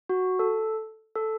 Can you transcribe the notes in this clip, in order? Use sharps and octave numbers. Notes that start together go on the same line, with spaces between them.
F#4
A4
A4